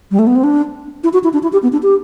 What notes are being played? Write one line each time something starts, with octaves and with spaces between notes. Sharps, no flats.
G3
A3
B3
C4
D4
E4
F#4
E4
D4
E4
G4
B3
D4
G4